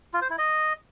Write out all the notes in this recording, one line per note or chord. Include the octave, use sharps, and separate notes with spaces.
F4
C5
E4
D#5